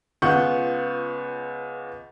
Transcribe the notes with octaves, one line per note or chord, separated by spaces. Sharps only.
C#2 B3 F4 F#5 C#6 G6